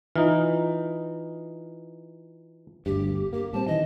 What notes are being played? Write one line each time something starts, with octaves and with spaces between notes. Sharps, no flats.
E3 D#4 F4
G1 D2 G2 G4
A#3 G4
A#2 G3 C4 A5
D#3 E3 D#5